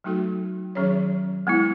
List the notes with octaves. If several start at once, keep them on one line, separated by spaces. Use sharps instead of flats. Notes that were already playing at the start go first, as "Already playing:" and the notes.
F#3 A3 D#4 F#4 A4
D#3 F#3 C#4 G#4 C#5
G#3 B3 E4